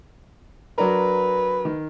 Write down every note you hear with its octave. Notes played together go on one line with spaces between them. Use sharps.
F#3 D4 A#4 B4
D#3